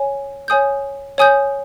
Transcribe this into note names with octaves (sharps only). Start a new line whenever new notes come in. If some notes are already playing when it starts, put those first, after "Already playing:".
Already playing: C#5 G#5
C#5 G#5 D#6 G6
C#5 G#5 D#6 G6